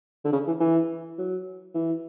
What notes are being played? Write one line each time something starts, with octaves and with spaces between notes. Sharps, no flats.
D3
C#3
E3
E3
F#3
E3